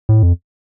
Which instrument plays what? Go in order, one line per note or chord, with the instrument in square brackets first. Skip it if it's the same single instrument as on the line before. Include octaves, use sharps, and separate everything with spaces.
[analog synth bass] A2
F2